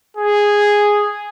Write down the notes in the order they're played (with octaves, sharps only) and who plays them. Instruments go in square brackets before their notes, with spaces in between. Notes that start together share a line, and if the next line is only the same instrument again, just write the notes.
[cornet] G#4